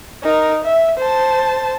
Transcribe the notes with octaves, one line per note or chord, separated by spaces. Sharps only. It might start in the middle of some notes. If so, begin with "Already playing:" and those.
D#4 A#4
E5
C5 A5